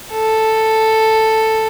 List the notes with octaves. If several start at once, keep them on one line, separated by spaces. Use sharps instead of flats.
A4